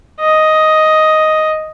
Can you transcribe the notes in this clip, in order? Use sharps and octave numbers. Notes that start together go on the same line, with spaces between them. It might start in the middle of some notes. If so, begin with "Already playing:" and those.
D#5